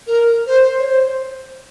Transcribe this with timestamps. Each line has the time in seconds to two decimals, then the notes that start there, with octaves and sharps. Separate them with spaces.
0.07 A#4
0.47 C5
0.79 C#5
0.86 C5